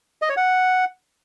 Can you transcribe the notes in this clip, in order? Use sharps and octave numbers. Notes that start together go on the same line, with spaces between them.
D#5
C#5
F#5